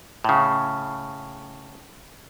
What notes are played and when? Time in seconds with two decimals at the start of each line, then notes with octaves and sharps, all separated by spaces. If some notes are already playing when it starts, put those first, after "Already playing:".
0.24 A2 C#3